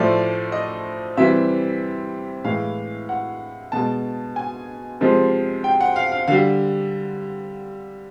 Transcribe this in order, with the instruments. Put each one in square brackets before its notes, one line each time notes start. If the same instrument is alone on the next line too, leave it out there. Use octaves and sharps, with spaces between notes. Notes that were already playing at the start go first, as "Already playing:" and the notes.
Already playing: [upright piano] A2 F3 A3 D5
D#5
C3 E3 G3 E5
A2 E3 G#3 F5
F#5
B2 G#3 A5
G#5
C3 F3 G#3
G5
F#5
F5
F5
D3 G3 F5